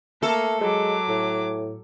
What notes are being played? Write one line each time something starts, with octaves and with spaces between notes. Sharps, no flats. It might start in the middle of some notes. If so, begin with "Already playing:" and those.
A3 A#3 A4
F#3 G#3 D6
A2